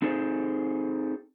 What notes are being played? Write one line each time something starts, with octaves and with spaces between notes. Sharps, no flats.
C4 D#4 G#4 A4 C5